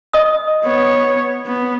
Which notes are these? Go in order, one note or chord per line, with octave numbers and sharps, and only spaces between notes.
D#5 D#6
B3 C#5
B3